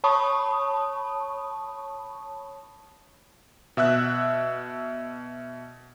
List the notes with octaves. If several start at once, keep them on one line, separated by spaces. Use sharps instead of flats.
C#5 A5 B5 C#6 D#6
B2 E5 E6 F#6